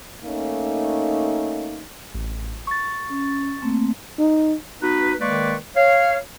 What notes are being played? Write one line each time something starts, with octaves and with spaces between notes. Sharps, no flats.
A3 A#3 C#4 D#4
A1
C#6 A6
C#4
A3 A#3 C4
D#4
B3 D#4 F#4 B4
D#3 G#3 A#3 B4 D5 C#6
C#5 F5